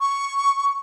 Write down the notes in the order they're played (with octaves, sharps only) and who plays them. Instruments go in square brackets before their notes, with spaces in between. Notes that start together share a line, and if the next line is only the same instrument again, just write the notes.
[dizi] C#6